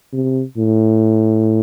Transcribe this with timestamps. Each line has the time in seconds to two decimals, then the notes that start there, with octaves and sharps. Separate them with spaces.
0.13 C3
0.58 A2